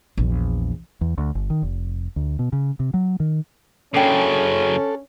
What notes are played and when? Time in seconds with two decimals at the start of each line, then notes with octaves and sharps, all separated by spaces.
0.17 A#1 E2
1.01 E2
1.18 D2
1.35 G1
1.50 D#3
1.62 F1
2.16 D2
2.39 B2
2.53 C#3
2.80 C3
2.94 F#3
3.20 D#3
3.94 F#2 C#3 C#4 D4 A4 G5